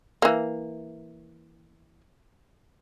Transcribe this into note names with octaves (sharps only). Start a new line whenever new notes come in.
E3 A#3